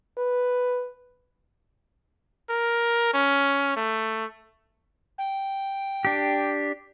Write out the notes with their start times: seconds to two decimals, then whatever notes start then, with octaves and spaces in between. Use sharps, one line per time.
0.18 B4
2.50 A#4
3.13 C#4
3.76 A3
5.18 G5
6.05 D4 G4